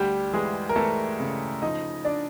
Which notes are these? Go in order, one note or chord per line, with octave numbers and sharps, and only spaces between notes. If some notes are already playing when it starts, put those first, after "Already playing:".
Already playing: D2 G3 G4
E3 G#3 G#4
A#4
E3 A3 A4
C#3
F3 D#4 D#5
D4 D5